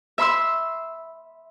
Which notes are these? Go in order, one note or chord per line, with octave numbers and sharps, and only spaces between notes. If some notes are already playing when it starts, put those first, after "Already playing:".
E5 B5 C6 E6